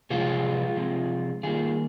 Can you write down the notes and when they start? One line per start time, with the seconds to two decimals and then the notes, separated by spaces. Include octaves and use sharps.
0.10 C3 F3 G#3 F4 G#4
0.76 C3 F3 G#3
1.43 D#3 G3 A#3 F4 G#4